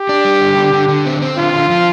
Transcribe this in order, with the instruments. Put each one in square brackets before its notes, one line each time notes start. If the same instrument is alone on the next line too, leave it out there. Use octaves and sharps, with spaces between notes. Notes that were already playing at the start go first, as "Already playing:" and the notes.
Already playing: [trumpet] G4
[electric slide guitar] D4
G3
D3
D3
D3
D3
C4
C4
[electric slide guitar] D3 [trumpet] F4
[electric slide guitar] D3
F3